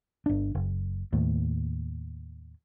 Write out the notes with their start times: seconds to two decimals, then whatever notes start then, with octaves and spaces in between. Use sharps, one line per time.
0.26 G1 D4
0.55 F#1
1.13 D#2 A2